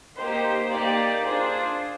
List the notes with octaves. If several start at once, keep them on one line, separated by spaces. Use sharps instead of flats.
A#3 D#4 G4 C5
A#3 D#4 G4 D5
D4 F4 G#4 C5